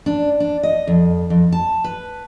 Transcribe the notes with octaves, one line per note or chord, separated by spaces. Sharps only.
D4
D4
D#5
F2
F2
A5
B4